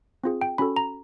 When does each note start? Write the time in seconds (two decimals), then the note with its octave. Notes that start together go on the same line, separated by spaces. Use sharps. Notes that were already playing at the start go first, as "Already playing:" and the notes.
0.24 C4 F4 G#4
0.41 G5
0.58 C#4 F#4 A4 B5
0.76 A#5